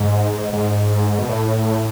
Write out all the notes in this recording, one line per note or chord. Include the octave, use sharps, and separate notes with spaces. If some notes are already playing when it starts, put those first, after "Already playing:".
Already playing: G#2
G#2
B2
A2